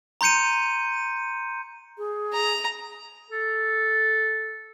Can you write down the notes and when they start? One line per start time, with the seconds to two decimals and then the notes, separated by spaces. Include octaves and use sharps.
0.21 A#5 C6 G6 C#7 D#7
1.98 G#4
2.33 A#5
3.31 A4